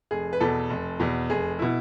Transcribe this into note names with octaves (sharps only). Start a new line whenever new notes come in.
F1 G#4
B4
E2 B2 A4
F1
E2 B2
F1 G#4
B2 E4